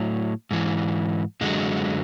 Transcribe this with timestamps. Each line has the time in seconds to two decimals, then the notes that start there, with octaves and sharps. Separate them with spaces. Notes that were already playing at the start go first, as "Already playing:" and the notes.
Already playing: A2 F#3
0.51 G#2 E3
1.41 F#2 D3 F#3 G#3